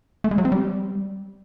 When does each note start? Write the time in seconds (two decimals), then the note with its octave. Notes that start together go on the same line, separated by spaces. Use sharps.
0.24 A3
0.31 G#3
0.38 F#3
0.45 C4
0.52 G3